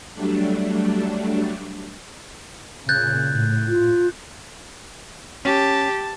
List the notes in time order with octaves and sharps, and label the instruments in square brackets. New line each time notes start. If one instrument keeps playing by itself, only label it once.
[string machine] F#3 G3 A3 D4
[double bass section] A#2 C#3 [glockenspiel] F#6 G6 A6
[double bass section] A2
[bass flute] F4
[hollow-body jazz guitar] C#4 [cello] G4 [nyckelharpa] A5